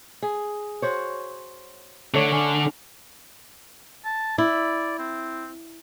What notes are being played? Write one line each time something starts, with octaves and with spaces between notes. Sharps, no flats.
G#4
F#4 C5 C#5
D3 A3 C#5
C#4
A5
E4 D5
C4